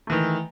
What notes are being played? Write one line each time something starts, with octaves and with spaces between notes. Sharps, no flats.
D#3 E3 A3